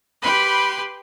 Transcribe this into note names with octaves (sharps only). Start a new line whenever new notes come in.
G4 B4 B5 C6